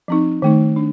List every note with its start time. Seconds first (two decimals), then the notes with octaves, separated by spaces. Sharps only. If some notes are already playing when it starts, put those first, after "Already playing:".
0.08 F3 C4 D#4
0.42 D#3 A3 D#4
0.76 D4